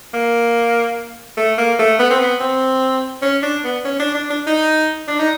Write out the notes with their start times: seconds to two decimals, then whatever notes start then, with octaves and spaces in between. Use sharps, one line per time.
0.14 A#3
1.37 A3
1.58 A#3
1.79 A3
1.99 B3
2.10 C4
2.20 B3
2.40 C4
3.22 C#4
3.43 D4
3.64 B3
3.85 C#4
3.99 D4
4.15 D4
4.30 D4
4.46 D#4
5.08 D4
5.19 D#4